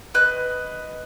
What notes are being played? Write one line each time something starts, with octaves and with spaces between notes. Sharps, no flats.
B4 D#5 F#6